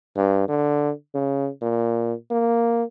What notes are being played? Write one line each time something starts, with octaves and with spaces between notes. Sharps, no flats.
G2
D3
C#3
A#2
A#3